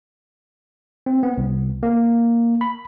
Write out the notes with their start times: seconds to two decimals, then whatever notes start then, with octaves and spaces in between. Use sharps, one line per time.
1.06 C4
1.23 B3
1.38 C2
1.83 A#3
2.61 B5